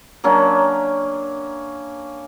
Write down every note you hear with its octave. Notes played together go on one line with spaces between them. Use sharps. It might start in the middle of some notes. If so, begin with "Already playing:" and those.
F#3 A#3 C#4 D4